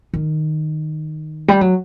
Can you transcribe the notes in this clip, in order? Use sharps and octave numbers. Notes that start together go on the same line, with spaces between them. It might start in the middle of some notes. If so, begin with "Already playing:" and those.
D#3
G3
F#3